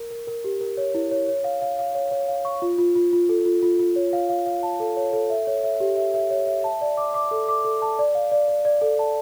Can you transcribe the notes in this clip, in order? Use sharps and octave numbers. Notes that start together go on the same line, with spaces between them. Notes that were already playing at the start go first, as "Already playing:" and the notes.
Already playing: A#4
A#4
A#4
G4
A#4
C#5
E4
C#5
C#5
F5
F5
F5
C#5
C#5
F5
C#6
F4
F4
F4
F4
A4
F4
F4
F4
C#5
F5
F5
F5
A5
A4
C#5
A4
E5
C#5
E5
G4
E5
E5
C#5
E5
A5
D5
D6
D6
A4
D6
A4
A5
D5
F5
D5
D5
D5
A4
A5